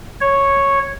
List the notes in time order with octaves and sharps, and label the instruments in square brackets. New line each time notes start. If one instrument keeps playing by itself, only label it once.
[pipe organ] C#5